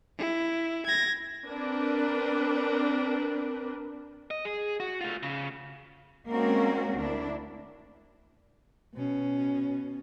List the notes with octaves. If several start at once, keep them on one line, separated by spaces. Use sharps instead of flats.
E4
G#6 A#6
C4 D4 A#4 B4
D#5
G#4
F#4
A3 F4
C#3
G#3 A#3 C4 C#4 F#4 A#4
D2 D4 E4
B2 C#4